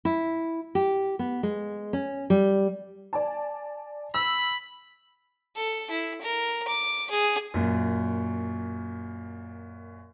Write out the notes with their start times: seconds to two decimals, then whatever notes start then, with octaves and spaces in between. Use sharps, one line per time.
0.05 E4
0.75 G4
1.19 B3
1.43 G#3
1.93 C#4
2.30 G3
3.13 D5 G#5 A5
4.14 B5 E6
5.56 A4
5.90 E4
6.21 A#4
6.68 D6
7.10 G#4
7.54 F#2 A#2